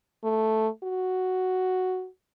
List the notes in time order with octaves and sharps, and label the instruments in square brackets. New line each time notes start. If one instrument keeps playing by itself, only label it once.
[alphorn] A3
F#4